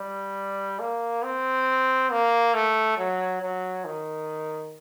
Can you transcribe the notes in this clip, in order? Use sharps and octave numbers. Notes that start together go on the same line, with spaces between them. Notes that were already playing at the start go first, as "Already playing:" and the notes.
Already playing: G3
A#3
C4
A#3
A3
F#3
F#3
D#3